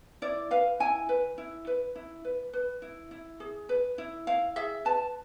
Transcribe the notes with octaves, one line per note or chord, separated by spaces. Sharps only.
E4 D5
B4 F5
E4 G#5
B4
E4
B4
E4
B4
B4
E4
E4
G#4
B4
E4
E4 F5
G#4 E5
B4 A5